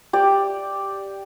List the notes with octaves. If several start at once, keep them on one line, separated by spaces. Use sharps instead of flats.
G4 D5